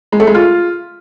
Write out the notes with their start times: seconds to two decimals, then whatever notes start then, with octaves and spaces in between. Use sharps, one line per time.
0.12 G#3
0.20 A3
0.27 G#3
0.34 F4